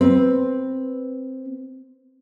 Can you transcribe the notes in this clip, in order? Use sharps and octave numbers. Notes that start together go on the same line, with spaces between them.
C4 B4